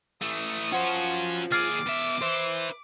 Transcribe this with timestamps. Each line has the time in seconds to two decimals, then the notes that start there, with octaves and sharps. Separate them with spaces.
0.22 E3 A3 D#6
0.72 C#4 F4 F#4 C5 F#5
1.52 D#2 G#4 D6 F6 A6 C7
1.86 B2 E5
2.22 B4 C5 E5